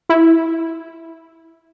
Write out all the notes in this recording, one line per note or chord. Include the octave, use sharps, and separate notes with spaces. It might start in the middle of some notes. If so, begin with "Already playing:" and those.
E4